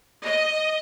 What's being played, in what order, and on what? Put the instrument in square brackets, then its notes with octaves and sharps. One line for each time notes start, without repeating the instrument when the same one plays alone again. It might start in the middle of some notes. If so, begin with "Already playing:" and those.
[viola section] D#5